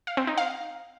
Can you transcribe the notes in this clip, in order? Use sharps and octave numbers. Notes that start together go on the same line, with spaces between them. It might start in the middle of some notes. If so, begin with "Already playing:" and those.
F5
C4
D#4
F5